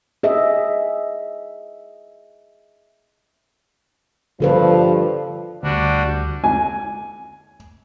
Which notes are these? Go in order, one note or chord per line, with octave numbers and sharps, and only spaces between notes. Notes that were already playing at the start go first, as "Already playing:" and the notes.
G#4 D#5 E5
G2 D3 F3 A4 B4
D2 G3 D4 F#4
G#5